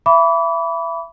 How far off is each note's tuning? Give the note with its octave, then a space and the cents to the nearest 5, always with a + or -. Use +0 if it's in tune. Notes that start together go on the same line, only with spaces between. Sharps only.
E5 +30 B5 +0 D6 -35